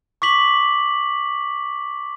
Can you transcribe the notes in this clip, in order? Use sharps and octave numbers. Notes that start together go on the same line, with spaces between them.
C#6 D6 B6 F#7